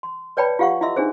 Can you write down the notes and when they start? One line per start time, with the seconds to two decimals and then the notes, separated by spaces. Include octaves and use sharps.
0.03 C6
0.37 B4 C#5 D5 G5 A5 B5
0.59 F4 G4 F5 F#5 C#6
0.81 E4 F4 D#5 E5 C6 E6
0.96 D4 D#4 G#4 C5